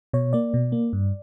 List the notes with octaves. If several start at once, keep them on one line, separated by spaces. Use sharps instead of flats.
B2 C#5
A#3 D5
B2
A#3
G2